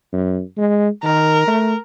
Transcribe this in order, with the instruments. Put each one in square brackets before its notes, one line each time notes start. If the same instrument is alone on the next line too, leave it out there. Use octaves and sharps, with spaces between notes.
[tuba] F#2
G#3
[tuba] D#3 [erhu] A#4
[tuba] A3